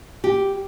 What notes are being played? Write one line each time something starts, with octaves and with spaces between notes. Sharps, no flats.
G4